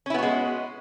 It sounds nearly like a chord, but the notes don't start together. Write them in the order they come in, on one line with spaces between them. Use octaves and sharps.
C#4 E4 B3 F#4 G#3